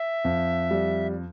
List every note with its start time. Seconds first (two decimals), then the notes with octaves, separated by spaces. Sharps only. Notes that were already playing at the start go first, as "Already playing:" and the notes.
Already playing: E5
0.25 F2
0.71 G3